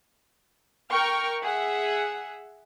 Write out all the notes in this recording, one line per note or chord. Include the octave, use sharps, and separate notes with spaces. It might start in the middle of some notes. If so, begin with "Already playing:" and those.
A#4 G5 C#6 F6
G#4 E5 F#5